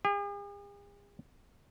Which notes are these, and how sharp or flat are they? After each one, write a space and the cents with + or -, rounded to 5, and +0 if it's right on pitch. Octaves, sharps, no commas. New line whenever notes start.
G#4 -45